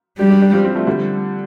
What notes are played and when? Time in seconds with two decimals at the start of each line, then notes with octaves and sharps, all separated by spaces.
0.19 G3 D4 G4
0.30 D4 G4
0.42 D4 G4
0.53 C4 F4
0.64 G3 C4
0.75 F3 A3
0.87 D3 G3